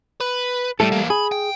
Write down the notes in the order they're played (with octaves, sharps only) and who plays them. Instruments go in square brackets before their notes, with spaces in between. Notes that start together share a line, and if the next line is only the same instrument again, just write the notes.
[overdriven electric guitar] B4
[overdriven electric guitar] A2 [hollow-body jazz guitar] G3 A3 A4
[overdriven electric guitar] E3 A#3
[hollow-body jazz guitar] G#4 [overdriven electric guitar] B5
[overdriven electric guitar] G5